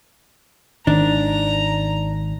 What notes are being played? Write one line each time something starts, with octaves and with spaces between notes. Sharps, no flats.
G#1 D#3 D4 A#5